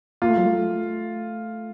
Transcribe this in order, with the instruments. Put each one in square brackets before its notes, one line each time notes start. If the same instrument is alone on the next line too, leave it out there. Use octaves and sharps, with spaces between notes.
[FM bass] A#3 [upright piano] F4
[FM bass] A3
F#3
A3